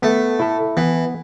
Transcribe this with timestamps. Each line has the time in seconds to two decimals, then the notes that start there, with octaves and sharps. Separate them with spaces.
0.02 A3 B3
0.39 E4 A4
0.77 E3 B3